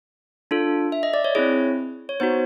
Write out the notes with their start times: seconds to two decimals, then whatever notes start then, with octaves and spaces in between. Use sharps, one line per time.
0.51 D4 F4 A4
0.92 E5
1.03 D#5
1.14 D5
1.24 C#5
1.35 C4 E4 G#4 C#5
2.09 C#5
2.20 B3 D#4 F#4 C5